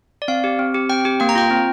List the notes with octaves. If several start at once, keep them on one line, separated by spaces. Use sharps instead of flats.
D5
C4 F5
G4
C4
G4
C4 G5
G4
A#3 G5
A#5
F4 G5
C4